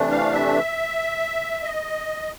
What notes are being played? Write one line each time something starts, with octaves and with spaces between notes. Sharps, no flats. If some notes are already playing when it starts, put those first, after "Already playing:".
Already playing: C3 E3 A3 D4
F5
E5
D#5